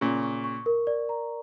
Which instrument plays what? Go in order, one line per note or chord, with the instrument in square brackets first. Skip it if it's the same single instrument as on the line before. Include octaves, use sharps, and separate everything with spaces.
[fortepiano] A#2 C#3 [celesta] C#6
[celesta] C#6
C#6
A#4
D5
A#5